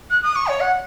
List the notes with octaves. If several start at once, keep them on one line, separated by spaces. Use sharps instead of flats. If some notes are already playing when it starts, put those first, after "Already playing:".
F#6
D#6
C#6
C#5
F#5